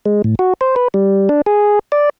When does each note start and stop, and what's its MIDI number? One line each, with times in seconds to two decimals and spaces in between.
0.06 0.22 56
0.24 0.35 45
0.39 0.54 66
0.61 0.75 72
0.76 0.88 71
0.94 1.29 55
1.29 1.42 62
1.46 1.79 68
1.92 2.09 74